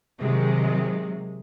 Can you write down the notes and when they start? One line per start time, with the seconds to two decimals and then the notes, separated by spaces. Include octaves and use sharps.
0.18 C3 D#3 F#3 G#3